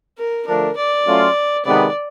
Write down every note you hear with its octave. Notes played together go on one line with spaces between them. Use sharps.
A#4
D3 F3 A3 D4 A#4
D5
F#3 A3 C#4 F4
C3 D#3 G#3 B3 D5